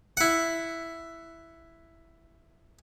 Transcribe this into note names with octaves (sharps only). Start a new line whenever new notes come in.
E4 F#5